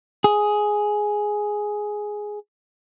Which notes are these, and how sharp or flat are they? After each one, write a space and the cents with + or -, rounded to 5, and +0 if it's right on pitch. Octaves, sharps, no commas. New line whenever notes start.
G#4 +5